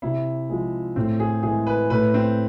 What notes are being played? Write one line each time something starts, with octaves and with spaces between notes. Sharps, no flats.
C3 E4
F3 G#3
A2 C4
G#4
E3 G#3 G#4
B4
A2 B4
C4